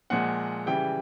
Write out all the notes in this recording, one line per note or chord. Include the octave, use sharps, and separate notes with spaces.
A#2 F3 G#3 F#5
C#3 E3 G3 G5